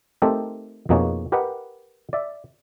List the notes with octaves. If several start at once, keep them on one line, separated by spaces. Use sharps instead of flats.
A3 C4 D#4 G4 A4 A#4
F2 B2 A#3 D#4 G#4 C#5
G4 A#4 B4 D#5 F#5
D5 E5